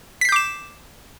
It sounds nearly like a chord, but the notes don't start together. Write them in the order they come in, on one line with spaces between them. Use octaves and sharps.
B6 C7 G6 D6 E7